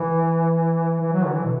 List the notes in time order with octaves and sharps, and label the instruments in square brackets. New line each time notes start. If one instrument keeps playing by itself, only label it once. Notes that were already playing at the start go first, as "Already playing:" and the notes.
Already playing: [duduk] E3
E3
F#3
D3
E3
B2